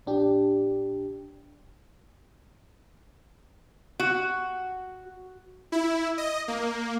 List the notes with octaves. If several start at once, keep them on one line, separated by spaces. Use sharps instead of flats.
A#1 D4 G4
F#4
E4
D#5
A#3